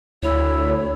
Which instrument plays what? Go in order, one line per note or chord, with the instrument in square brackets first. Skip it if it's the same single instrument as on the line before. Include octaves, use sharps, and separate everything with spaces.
[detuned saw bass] D2 [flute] E4 [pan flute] C#5